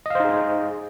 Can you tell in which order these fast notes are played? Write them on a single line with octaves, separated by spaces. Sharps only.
D#5 F5 C5 D#4 G#4